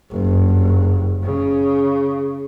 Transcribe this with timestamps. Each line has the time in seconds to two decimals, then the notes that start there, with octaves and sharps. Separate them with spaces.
0.11 F#1 G2
1.23 C#3